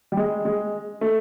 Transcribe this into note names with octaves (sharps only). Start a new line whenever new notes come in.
G3
G#3
G#3
A3